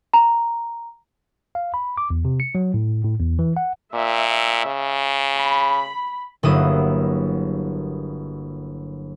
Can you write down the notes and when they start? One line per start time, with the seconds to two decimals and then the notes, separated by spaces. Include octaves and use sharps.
0.14 A#5
1.55 F5
1.74 B5
1.98 D6
2.10 E2
2.25 C3
2.40 C#7
2.55 F#3
2.74 A2
3.04 A2
3.19 E2
3.39 E3
3.57 F#5
3.94 A#2 E5
4.65 C#3
5.36 B5
6.43 G1 F#3 A#3 E4 D#6